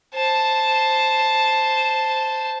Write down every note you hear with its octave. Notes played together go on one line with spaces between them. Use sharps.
C5 A5